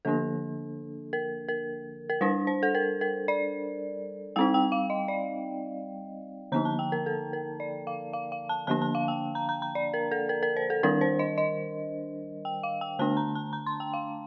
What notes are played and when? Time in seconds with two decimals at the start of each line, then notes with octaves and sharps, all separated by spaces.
0.05 D3 F3 A#3 D4 A4
1.13 A#4
1.48 A#4
2.10 A#4
2.21 G3 D4 C5
2.47 C5
2.63 A4
2.75 A#4
3.01 A#4
3.28 D5
4.36 G3 C4 D#4 G5
4.54 G5
4.72 F5
4.90 D#5
5.08 D5
6.52 D3 F3 A#3 D#4 A#5
6.65 A5
6.79 G5
6.92 A#4
7.06 A4
7.33 A#4
7.60 D5
7.87 F5
8.13 F5
8.32 F5
8.49 A5
8.67 D3 F3 A#3 D4 A5
8.82 A5
8.95 F5
9.08 G5
9.35 A#5
9.49 A#5
9.62 A#5
9.75 D5
9.94 A#4
10.11 A4
10.29 A#4
10.43 A#4
10.56 C5
10.70 A4
10.83 D#3 G3 D4 A#4
11.01 C5
11.19 D#5
11.38 D#5
12.45 G5
12.63 F5
12.81 G5
12.99 D3 A3 D4 A5
13.17 A#5
13.35 A5
13.53 A#5
13.66 C6
13.80 G5
13.94 F5